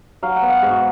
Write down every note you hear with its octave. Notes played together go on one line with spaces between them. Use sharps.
F#3 F5
F#5
B3
F5
G#2 G#4
F#4